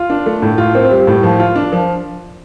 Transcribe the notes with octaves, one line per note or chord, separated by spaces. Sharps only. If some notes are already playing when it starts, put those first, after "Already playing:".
Already playing: F4
D4
A3
A2
F4
C4
G3
A2
F3
F4
D4
F3